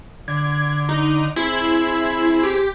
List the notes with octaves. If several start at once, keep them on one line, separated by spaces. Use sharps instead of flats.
D3 G#6
D#4
C4 E4 G#4
G4